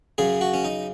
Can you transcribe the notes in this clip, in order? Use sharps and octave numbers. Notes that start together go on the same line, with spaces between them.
F#2 C#3 G#4
F#4
C#4
D#4